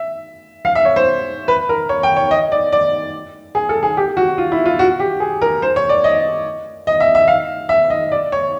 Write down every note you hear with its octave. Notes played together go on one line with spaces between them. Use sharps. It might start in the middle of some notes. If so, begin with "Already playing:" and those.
Already playing: E5
F5
E5
C#5
C5
B4
A#4
C#5
G5
C#5
D#5
D5
D5
G#4
A4
G#4
G4
F#4
F4
E4
F4
F#4
G4
G#4
A#4
C5
C#5
D5
D#5
D#5
E5
E5
F5
E5
D#5
D5
C#5